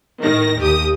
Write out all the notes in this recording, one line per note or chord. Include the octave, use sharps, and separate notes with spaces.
A2 D#3 A#6
D#2 G4 D#6